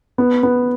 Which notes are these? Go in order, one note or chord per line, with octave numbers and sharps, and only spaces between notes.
B3
B3